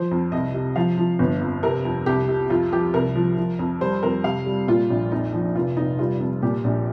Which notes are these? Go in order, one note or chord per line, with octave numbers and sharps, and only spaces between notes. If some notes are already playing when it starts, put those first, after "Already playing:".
Already playing: F3 C5
F2
C2 D#5
C3
F3 F5
F3
G1
F2
C3 A#4
F2
C2 G4
C3
F2 F4
F3 G4
C2 A#4
F3
F3
F2
G3 C5
F2 A#4
C3 F5
G3
A#2 F4
A#1
F2 D#4
F3
F1 F4
F1 D#4
G3 F4
F2
A#2 G4
A#1